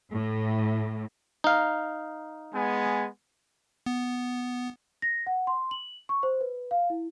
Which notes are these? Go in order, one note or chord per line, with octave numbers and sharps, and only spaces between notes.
A2
D#4 F5
G#3 B3 G#5
B3
A#6
F#5
C6
F#7
C#6
C5
B4
F5
E4